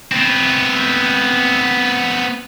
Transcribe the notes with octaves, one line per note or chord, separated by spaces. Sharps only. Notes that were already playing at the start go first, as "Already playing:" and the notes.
B3 C4